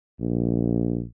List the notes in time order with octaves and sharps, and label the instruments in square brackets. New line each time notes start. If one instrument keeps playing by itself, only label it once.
[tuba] A#1